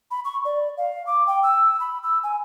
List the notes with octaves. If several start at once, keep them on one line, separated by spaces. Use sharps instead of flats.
B5
C#6
D5
F5
D6
G5
E6
B5
E6
G#5